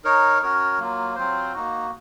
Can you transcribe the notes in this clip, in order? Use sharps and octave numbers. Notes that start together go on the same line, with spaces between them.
D#4 A#4 C#5
C#4 F#4 A#4 C#5
F#3 A#3 F4
F#3 C4 F4 C5
A#3 D#4 F#4